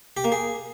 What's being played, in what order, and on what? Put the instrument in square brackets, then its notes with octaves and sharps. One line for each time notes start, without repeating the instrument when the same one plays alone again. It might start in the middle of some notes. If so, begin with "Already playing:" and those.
[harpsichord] G4
A#3
G#4